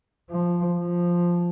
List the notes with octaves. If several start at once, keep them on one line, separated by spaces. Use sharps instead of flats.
F3
F3